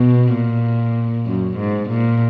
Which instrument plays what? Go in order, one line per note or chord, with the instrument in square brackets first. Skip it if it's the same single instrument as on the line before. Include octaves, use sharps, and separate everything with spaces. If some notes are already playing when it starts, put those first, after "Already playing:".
Already playing: [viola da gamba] B2
A#2
F#2
G#2
A#2